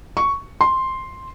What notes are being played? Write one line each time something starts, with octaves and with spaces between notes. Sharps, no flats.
C#6
C6